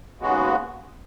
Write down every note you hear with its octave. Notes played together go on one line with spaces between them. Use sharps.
D#2 C#3 G#3 B3 F#4